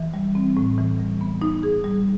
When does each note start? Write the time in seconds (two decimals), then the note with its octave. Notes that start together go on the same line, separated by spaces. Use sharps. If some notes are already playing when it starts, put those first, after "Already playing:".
Already playing: E3
0.14 G3
0.35 C4
0.57 A2
0.78 E3
0.99 G3
1.21 B3
1.42 D#4
1.63 G#4
1.84 G3